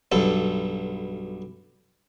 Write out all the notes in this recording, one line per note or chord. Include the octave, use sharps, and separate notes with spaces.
B1 G2 A4